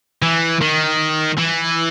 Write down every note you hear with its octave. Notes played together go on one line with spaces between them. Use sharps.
E3
D#3
E3